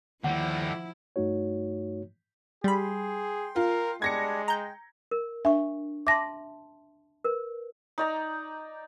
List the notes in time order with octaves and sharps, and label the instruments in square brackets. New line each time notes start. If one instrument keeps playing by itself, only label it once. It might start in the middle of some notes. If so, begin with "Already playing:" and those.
[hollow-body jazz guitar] D#2 [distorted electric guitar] D3 G3 [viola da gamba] F3 E4 [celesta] F#5
[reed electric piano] G2 A3 D#4 F#4 C#5
[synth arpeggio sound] G3 B5 [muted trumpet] G#4 [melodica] G5 C6
[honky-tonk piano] F4 [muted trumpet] A#4
[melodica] G3 D4 G4 [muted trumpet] G#3 [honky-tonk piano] G#6 A#6 C#7
[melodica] G5 [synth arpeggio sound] A#5 G6
[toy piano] A#4
[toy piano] D4 C#6 [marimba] E5
[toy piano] E5 A5 C6 [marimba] D6 A#6
[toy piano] A#4 B4
[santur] D#4 D5 A#5